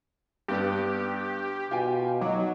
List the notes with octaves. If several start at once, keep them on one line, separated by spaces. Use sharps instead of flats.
G2 B3 D4 G4
B2 F4 G5 G#5
F#3 D#4 D6